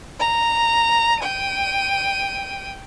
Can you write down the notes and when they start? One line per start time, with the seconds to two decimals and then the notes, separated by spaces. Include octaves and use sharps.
0.20 A#5
1.20 G5 D#7